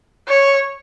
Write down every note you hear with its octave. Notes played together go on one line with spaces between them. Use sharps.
C#5